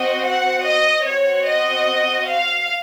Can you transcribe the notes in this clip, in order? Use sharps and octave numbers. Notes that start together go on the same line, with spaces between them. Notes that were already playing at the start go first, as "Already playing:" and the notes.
Already playing: C4 F#4 D#5
F#5
D#5
C4 F#4 C#5
D#5
F5